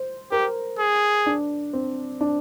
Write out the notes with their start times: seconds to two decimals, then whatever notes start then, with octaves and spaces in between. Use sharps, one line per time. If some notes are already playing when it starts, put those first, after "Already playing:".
Already playing: C5
0.32 G4 A#4
0.79 G#4
1.26 D4
1.73 C4
2.21 D4